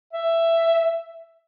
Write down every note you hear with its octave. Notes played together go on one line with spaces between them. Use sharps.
E5